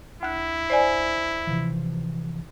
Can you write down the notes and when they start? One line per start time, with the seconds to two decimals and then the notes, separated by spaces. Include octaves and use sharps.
0.23 D2 E4 F#6
0.70 C5 D5 G#5
1.47 C3 E3 F3